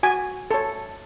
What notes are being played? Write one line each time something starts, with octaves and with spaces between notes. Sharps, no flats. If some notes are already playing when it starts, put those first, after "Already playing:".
F#4 G#5
A4 C#5